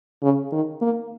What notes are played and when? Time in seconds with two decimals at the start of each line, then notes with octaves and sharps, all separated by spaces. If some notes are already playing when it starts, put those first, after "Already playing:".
0.23 C#3
0.52 D#3
0.82 A#3